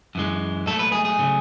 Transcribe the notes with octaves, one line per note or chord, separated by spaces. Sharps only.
F#2 E3 G#3
G#2 F#3 A3 A4
B4
G#4
G#4
C#3 F#3 A3